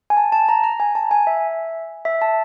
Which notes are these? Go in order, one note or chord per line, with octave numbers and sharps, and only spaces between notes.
G#5
A5
A5
A#5
A#5
G#5
A5
G#5
E5
E5
A5